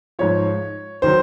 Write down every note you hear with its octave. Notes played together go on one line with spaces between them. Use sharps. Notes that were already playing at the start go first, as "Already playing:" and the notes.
G#2 F3 C#5
D#3 F#3 C5